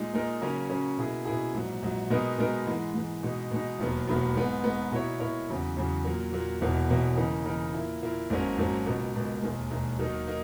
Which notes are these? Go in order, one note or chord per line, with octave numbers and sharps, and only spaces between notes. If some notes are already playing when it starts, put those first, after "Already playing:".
Already playing: A#2 G#3 D#4
A#2 G#3 D#4 A#4
C#3 F#3 A#3 C#4
C#3 F#3 A#3 C#4
B2 A#3 E4 G#4
B2 A#3 E4 G#4
A#1 G#2 F#3
A#1 G#2 F#3
B2 G#3 B3 D#4 A#4
B2 G#3 B3 D#4 A#4
G#2 E3 G#3
G#2 E3 G#3
B2 G#3 D#4
B2 G#3 D#4
E1 D#2 D#3 F#3 B3
E1 D#2 D#3 F#3 B3
G#2 D#3 G#3 B3
G#2 D#3 G#3 B3
B2 A#3 E4 A#4 C#5
B2 A#3 E4 A#4 C#5
E2 C#3 F#3
E2 C#3 F#3
A#2 F#3 A#3
A#2 F#3 A#3
E1 E2 B2 A#3
E1 E2 B2 A#3
C#3 E3 A#3 D#4 A#4
C#3 E3 A#3 D#4 A#4
A#2 A#3 E4
A#2 A#3 E4
G#1 G#2 F#3 A#3 C#4
G#1 G#2 F#3 A#3 C#4
C#2 B2 A#3
C#2 B2 A#3
E1 D#2 D#3 G#3
E1 D#2 D#3 G#3
D#2 D#3 F#3 A#3 D#4
A#3 D#4